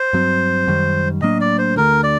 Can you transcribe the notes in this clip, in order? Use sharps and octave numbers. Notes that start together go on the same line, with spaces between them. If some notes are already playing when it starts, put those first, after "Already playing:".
Already playing: C5
G2 F#3 C4
F#2 D#3 G3
A2 F#3 A#3 D4 D#5
D5
C5
D2 D3 A3 A#4
D5